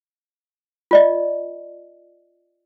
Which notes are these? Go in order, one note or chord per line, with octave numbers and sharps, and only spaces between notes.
F4 D5 D#5